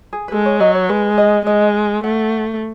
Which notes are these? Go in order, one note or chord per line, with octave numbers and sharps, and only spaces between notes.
G#4
B4
G#3 A4
C#5
F#3 D#5
C#5
G#3 B4
D#5
G#3 D#5
A3 F#5